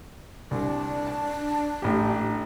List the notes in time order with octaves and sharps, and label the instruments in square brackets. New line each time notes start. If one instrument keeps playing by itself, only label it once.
[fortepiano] C2 [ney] D4
[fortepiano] A5
A1 G4